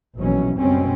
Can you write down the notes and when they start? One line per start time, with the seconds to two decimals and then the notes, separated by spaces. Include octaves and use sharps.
0.17 A#1 B2 E3 F#3 C#4
0.57 F#1 F#2 B2 G3 C4 C#4